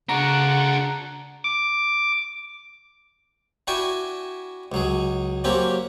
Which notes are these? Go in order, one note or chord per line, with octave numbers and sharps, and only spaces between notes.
C#3 D4 F#4 F#5 A#5
D6
D4 E4 F#4 E5 G5 G#5
C#2 F#3 G#4
F#3 A#3 C4 C#4 G4